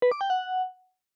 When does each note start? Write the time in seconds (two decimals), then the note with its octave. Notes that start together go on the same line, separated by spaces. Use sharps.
0.02 B4
0.12 D6
0.21 G5
0.30 F#5